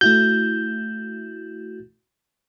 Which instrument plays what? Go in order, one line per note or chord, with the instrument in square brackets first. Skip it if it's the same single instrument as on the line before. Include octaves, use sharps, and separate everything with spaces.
[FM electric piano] A3 E4 F#4 [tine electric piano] G6